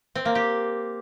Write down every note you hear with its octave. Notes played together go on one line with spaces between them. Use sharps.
C4
A#3
G4